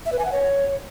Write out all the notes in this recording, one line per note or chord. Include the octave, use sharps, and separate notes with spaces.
E5
B4
G#5
F#5
C#5